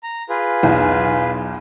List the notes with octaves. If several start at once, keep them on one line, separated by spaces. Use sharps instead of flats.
A#5
F4 G#4 B4
B1 E2 G#5